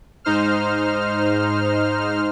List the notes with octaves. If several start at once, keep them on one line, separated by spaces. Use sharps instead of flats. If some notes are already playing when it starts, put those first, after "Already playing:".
G#2 D#4 C5 F6